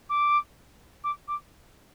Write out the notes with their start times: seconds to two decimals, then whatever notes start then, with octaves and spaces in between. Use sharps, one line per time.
0.09 D6
1.04 D6
1.28 D6